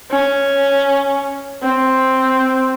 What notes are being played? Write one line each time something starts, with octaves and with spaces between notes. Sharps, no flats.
C#4
C4